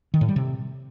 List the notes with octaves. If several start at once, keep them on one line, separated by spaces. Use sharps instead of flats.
D#3
A2
G3
C3